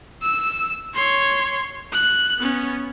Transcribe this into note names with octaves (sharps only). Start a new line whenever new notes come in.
E6
C#5 C6
F#6
B3 C#4